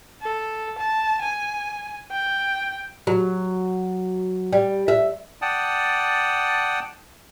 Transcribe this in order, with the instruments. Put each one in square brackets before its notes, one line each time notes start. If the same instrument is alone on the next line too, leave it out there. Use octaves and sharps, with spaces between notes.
[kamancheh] A4
A5
G#5
G5
[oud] F#3
G3
E5
[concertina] D5 F#5 G5 A5 D#6